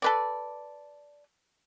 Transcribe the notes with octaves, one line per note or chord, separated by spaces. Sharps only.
A4 B4 D5